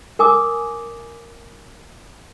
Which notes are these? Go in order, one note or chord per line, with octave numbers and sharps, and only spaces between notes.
A#4 G#5 D6 D#6